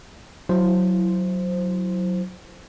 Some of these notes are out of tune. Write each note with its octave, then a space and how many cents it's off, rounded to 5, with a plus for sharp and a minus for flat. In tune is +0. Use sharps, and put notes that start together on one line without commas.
F#3 +0 E4 +10 C5 +0